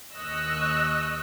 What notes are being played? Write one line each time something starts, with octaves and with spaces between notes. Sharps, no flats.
D#2 D#5 C#6 E6 F#6